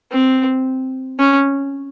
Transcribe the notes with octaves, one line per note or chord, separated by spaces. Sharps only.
C4
C#4